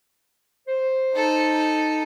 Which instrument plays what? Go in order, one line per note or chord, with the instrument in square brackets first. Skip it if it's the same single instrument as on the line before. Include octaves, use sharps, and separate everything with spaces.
[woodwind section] C5
[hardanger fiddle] D#4 A4